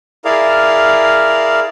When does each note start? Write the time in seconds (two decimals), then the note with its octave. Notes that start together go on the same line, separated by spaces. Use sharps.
0.25 E4 G#4 A#4 D5 F5